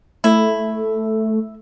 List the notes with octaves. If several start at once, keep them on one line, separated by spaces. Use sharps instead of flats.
A3 E4